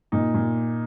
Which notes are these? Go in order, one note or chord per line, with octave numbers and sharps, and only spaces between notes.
A#2 D#4
A#2